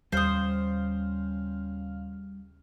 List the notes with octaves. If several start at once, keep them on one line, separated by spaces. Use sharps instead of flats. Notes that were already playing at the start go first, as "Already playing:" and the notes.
D#2 C#3 G3 C5 F5 D#6 F6